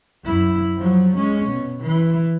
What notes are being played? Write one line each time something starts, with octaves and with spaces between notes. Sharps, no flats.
F#2 E4
F3 F#3
G#3 C#4
B2
E3